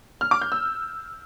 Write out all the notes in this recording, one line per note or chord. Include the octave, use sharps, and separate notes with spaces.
F6
D6
G6
E6